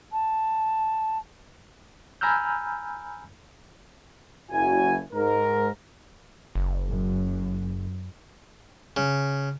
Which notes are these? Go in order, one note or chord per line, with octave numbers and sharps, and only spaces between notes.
A5
G#5 A#5 B5 E6 F6 G6
F#1 E4 F#4 G#5
G#2 A#4
F#1
F#2
C#3